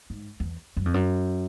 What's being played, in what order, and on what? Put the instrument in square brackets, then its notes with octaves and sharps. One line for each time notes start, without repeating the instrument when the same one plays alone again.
[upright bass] G#2
E2
F#2
F2
F#2